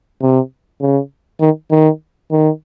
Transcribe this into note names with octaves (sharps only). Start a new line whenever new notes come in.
C3
C#3
D#3
D#3
D#3